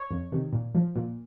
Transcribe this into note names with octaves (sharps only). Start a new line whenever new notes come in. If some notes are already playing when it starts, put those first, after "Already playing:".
Already playing: C#5
F2
C3 D#3
A#2
F3
A#2